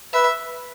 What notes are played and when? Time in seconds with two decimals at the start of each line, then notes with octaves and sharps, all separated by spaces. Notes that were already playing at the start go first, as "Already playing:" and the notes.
0.13 B4 E5